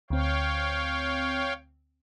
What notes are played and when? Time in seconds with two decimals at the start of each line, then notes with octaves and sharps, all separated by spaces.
0.10 D2 C4 C#5 F5 G5